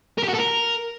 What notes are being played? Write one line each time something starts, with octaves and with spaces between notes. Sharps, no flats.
A#4
G4
F#4
A4
A#4